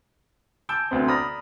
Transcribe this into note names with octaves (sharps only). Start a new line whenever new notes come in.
G#5 A5 E6 G6 D7
D2 B3 C4
D5 A#5 B5 D#6 F6 A#6